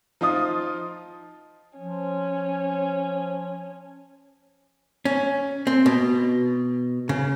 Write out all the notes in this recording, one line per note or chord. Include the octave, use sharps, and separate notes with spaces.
F3 D#4 F4 D#5 D#6
F3 C#4
C#4
C4
B2
C#3